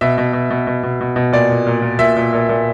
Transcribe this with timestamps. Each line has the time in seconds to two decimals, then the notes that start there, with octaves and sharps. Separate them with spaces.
0.01 B2 E5
0.18 B2
0.33 B2
0.50 B2
0.67 B2
0.83 B2
1.01 B2
1.16 B2
1.32 A#2 D5
1.50 A#2
1.67 A#2
1.82 A#2
1.99 A#2 E5
2.16 A#2
2.33 A#2
2.49 A#2